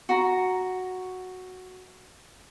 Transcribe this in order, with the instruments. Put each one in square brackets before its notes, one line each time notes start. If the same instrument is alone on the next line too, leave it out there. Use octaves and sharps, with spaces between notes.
[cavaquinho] F#4 A#5